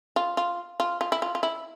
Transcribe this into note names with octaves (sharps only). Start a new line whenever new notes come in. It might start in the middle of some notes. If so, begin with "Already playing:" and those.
F4
F4
F4
F4
E4
F4
F4
E4